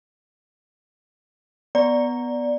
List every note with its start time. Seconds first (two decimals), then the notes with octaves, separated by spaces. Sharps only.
1.75 B3 D5 A#5